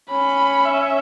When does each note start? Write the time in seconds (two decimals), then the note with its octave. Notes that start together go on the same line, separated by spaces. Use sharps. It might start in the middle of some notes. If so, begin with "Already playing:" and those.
0.11 C#4 B5
0.65 E5